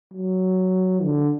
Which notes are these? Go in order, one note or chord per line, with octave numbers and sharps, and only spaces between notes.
F#3
D3